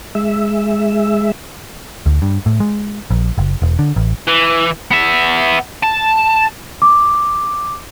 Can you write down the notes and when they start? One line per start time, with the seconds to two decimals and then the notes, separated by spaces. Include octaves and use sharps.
0.15 G#3 E5
2.06 D2
2.22 G2
2.46 A2
2.60 G#3
3.11 A#1
3.38 F#1
3.62 E1
3.79 D3
3.96 A1
4.27 E3
4.91 B3 E5
5.84 A5
6.82 D6